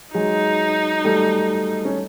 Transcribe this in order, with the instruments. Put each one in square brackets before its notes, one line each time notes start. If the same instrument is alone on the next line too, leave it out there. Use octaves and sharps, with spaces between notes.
[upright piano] F#3 G#3 [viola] D#4
[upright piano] G3 A3
C#4